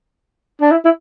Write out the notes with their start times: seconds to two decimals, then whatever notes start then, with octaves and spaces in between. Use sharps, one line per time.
0.61 D4
0.71 E4
0.85 E4